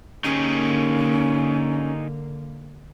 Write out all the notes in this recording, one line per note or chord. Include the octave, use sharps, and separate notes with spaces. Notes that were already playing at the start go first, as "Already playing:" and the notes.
D3 A#3 C#4 D#4 G4 G#4